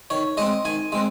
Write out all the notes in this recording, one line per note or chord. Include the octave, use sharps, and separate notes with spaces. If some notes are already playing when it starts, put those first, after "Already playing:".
D#3 C#5
G#3 C4 D#5
D#3 G#5
G#3 C4